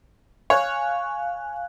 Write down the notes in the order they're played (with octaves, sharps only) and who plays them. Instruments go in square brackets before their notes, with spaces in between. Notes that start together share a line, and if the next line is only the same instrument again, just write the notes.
[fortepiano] C#5 [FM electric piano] F5 G#5 F#6